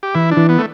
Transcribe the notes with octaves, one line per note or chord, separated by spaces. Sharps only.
G4
E3 E4
D4
E3
B3
A3